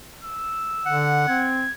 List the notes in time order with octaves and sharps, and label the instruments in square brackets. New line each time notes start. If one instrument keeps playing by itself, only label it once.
[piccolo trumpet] E6
[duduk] D3 [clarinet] F#5
[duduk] C4 [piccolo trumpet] G#6